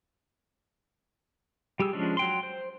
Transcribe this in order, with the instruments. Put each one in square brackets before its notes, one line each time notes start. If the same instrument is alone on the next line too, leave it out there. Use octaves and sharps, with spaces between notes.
[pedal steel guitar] G3 G4 G#4 E6
F3 G#3 C#4 D4
F#3 G5 C6
C5